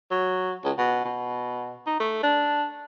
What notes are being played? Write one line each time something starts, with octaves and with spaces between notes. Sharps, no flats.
F#3
C#2
B2
B2
D#4
A3
D4